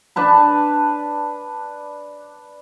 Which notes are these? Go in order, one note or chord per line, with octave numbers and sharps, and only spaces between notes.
D4 B4 A5 B5